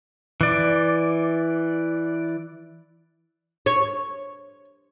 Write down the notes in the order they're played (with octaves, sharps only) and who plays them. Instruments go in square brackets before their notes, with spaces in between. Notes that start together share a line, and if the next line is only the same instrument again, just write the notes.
[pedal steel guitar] E3 D5
[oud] C#5